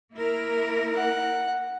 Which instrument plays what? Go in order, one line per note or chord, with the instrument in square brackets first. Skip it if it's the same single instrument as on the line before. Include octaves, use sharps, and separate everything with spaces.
[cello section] A#3 E4 A#4
[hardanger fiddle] F#5